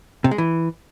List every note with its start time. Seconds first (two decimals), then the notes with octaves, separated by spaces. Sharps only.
0.24 C3
0.31 G#3
0.38 E3